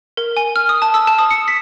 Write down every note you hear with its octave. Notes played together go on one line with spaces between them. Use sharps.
A#4
G#5
F6
D#6
A5
E6
A5
D#6
C#7
B6